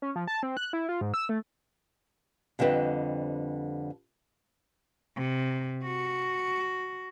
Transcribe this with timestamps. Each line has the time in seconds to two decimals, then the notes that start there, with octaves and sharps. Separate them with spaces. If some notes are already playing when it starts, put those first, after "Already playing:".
0.02 C#4
0.16 F3
0.27 A5
0.43 C4
0.57 F#6
0.73 E4
0.89 F4
1.01 G#2
1.14 E6
1.29 A3
2.59 F2 D3 G3 C4 B4 D#5
5.17 C3
5.84 F#4